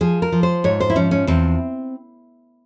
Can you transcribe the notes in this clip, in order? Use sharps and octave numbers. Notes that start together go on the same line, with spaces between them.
F3 G#4
A#4
F3
C5
G#2 C#5
C5
E4
F3 C#4
C#4
E2 C4